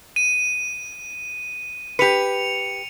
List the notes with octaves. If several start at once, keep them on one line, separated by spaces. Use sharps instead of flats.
D#7
G4 B4 C#7 F7